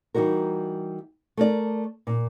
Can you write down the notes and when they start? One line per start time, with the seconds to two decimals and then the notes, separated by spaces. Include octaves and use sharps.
0.14 E3 G3 D#4 F#4 A#4
1.37 A3 A#4 D5
2.07 A#2